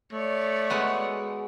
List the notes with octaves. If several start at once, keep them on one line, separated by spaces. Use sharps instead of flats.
A3 C#5 D5
G#3 B3 F#4